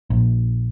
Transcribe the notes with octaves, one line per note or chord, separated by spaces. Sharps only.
A#1